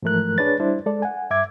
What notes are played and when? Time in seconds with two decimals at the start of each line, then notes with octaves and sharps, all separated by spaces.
0.03 G#2 E3 F3 A3 A#4 F#6
0.38 D4 G#4 B4 C#5 A6
0.60 G3 D4 E4 C5
0.86 G#3 A4 D5
1.02 F#5 G#5
1.30 G2 E5 D6 G#6